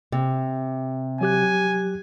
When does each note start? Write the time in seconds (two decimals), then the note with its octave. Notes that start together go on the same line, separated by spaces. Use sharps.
0.12 C3
1.21 F#3 G4 G#5 F#6